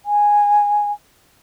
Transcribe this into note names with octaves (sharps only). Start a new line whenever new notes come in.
G#5